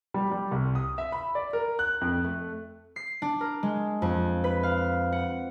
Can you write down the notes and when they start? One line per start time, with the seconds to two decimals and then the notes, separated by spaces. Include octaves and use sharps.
0.14 G3
0.31 G3
0.51 C2
0.75 D#6
0.98 E5
1.12 B5
1.35 D5
1.53 A#4
1.79 F#6
2.01 F2
2.25 A3
2.96 C7
3.22 D4
3.41 A#4
3.63 G#3
4.02 F2
4.44 B4
4.63 F5
5.12 F#5